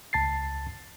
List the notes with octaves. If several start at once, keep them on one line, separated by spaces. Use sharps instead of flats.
C#2 A5 A6 C7